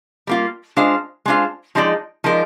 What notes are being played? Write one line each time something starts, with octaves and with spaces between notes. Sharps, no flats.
G3 A#3 F4
G#3 D4 F4 C5 F5
G#3 D4 F4 C5 F5
F3 G#3 D#4 A#4 D5
F3 G#3 D#4 A#4 D5